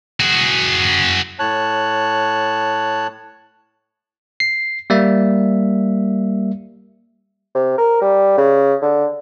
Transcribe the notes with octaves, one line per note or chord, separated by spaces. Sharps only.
F#4 G#4
A2 C#5 A5 F#6
C7
G3 A#3 E5
C3
A#4
G3
C#3
D3